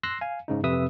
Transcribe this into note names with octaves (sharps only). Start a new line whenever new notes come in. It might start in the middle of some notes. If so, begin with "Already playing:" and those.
C6 E6 F#6 A#6 C7
F5 G#5
G#2 C#3 D#4
F2 C3 B4 E5 D#6 E6